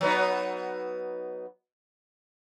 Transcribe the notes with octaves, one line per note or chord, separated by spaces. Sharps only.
F#3 B3 D#4